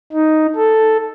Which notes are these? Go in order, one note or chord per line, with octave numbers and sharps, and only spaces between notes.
D#4
A4